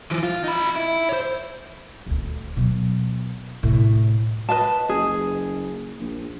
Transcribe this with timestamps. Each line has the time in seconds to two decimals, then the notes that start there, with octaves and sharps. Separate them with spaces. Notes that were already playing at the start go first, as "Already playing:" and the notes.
0.11 E3 F3
0.23 F4
0.44 D#4 B5
0.76 E4
1.09 C5 C#5
2.06 D#1 D2
2.56 B2 F#3
3.63 A2 C3
4.49 B4 D#5 A5
4.89 F#1 G#4
6.00 A#1